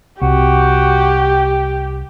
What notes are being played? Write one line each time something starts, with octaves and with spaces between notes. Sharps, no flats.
C2 F#4 G4